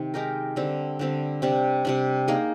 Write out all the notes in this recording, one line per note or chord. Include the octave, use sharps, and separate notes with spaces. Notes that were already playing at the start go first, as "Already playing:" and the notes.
Already playing: C3 D#3
G#3 D#4 G4 A#4
D3 G3 C4
D3 G3 C4
C3 G3 D4
C3 G3 D4
A#3 D#4 G#4